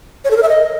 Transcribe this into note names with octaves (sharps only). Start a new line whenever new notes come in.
C#5
A4
A#4
E5
D#5